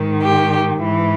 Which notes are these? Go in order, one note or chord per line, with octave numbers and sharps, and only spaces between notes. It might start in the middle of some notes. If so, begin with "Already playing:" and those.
Already playing: G#2 D#3
G4
G#2 E3